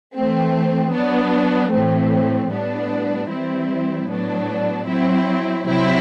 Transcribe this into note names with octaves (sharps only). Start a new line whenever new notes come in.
E3 A3 C4
F#3 B3 D4
A2 E3 A3 C4
A2 G3 B3 D4
E3 G3 C4 E4
A2 F#3 B3 D4
F#3 C4 E4
C3 F#3 C4 E4